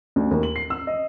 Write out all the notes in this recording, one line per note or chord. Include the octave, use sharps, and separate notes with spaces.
D2
D#2
F#7
C7
E6
D#5